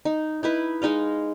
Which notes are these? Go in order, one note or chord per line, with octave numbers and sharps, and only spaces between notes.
D#4
D#4 E4 B4
G#3 D#4 D#5 F5